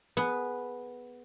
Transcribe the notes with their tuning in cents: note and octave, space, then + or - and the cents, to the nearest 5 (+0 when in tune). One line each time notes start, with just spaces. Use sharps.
B3 +0 G#4 +15 B4 +0